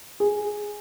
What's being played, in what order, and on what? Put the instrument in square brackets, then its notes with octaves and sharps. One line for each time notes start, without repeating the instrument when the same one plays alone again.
[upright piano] G#4